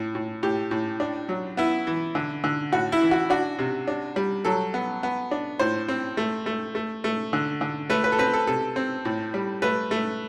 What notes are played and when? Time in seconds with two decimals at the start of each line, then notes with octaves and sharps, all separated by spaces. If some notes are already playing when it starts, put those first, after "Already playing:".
Already playing: A2
0.15 A2
0.43 A2 G4
0.71 A2
1.00 D4
1.29 F#3
1.57 B3 E4
1.87 E3
2.15 D3
2.44 D3
2.72 A2 F#4
2.92 E4
3.01 E3
3.11 F#4
3.30 D4 F#4
3.59 C3
3.87 D4
4.16 G3
4.45 F#3 A4
4.74 B3
5.03 B3
5.31 D4
5.59 A2 C5
5.88 C4
6.17 A3
6.46 A3
6.75 A3
7.04 A3
7.33 D3
7.61 D3
7.90 A3 B4
8.04 B4
8.12 A4
8.19 C4 B4
8.33 A4
8.47 C3 A4
8.76 C4
9.05 A2
9.34 G3
9.62 A3 B4
9.91 A3